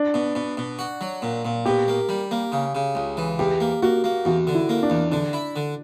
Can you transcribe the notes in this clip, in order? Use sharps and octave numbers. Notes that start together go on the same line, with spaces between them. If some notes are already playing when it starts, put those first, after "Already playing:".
Already playing: D4
B2
B2
B2
F#4
F#3
A#2
A#2
B2 G4
A#3
G3
A#3
C#3
C#3
C#2
E3
E2 G4
A#3
A#3 F#4
A#3
E2 F#4
D3
E4
A#3
D4
E2
D3 D4
E4
D3